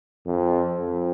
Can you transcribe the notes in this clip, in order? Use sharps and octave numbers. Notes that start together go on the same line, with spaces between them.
F2
F2